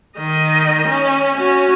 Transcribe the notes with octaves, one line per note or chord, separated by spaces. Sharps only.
D#3 D#5
C#4
C#4 F#4